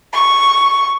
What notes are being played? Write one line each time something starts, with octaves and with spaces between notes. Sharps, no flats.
C#6